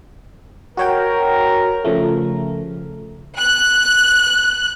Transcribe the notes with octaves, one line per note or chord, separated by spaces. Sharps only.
F#4 A#4 C#5 G5
C#3 F3 A3
F#6